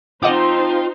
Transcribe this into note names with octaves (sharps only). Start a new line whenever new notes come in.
F3 C4 D#4 F4 C5 D#5 F#5 D6